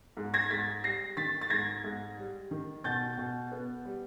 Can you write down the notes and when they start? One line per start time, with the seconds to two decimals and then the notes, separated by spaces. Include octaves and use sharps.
0.17 G#2
0.34 G#6 A#6
0.50 G#2 A6 B6
0.84 G3 A#6 C7
1.17 D#3 A6 B6
1.41 A6
1.50 G#2 G#6 A#6
1.84 G#2
2.18 G3
2.51 D#3
2.84 B2 G6 A6
3.18 B2
3.52 B3
3.85 G3